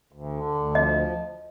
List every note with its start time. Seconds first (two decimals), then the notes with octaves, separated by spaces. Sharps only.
0.12 D2
0.34 D3
0.55 D2
0.75 F3 D#5